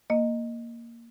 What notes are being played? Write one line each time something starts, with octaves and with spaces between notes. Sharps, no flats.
A#3 D#5